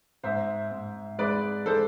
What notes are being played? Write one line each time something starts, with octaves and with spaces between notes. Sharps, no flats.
G#2 C5 E5
G#2
G#3 B4 D5
G#3 A4 C5